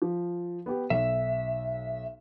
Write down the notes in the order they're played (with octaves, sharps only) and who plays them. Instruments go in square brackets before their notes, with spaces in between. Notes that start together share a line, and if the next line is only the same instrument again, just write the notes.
[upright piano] F3
B3 G4
[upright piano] B1 [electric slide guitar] E5